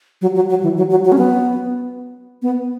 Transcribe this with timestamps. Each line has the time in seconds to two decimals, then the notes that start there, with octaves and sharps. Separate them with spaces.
0.22 F#3
0.35 F#3
0.49 F#3
0.63 E3
0.77 F#3
0.90 F#3
1.05 F#3
1.12 C#4
1.18 B3
2.42 B3